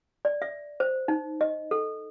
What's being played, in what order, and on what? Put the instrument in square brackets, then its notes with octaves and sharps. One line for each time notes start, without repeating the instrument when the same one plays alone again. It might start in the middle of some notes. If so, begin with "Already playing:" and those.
[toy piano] D5
E5
C5
D#4
D#5
A4